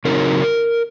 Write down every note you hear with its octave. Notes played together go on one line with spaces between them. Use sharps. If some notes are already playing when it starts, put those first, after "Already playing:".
C#3 F#3 C4 D#4 A#4